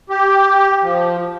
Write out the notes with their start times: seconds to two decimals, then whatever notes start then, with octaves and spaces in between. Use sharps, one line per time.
0.10 G4
0.82 F3